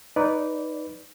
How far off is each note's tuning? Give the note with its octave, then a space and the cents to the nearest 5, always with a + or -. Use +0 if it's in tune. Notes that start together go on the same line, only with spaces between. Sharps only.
D#4 +0 B4 +0 D5 -15